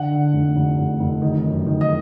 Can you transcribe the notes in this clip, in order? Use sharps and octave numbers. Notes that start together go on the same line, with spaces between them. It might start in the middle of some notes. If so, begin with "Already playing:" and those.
Already playing: D3 F#5
D3
F1
F1
F1
F1
D#3
F#2
D#3
D#5